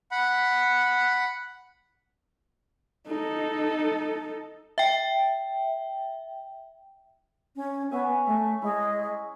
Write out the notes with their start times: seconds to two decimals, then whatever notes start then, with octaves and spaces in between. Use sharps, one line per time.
0.11 F#5 B5
3.07 D#4 A4
4.78 E5 G5
7.56 C#4
7.91 B3 C#4 E5 G#5
8.27 A3 E5 G#5
8.62 G#3 E4